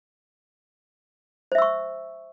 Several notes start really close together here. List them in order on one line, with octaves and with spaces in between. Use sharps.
C5 E5 E6 C#6